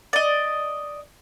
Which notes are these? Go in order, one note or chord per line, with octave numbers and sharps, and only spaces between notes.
D5 D#5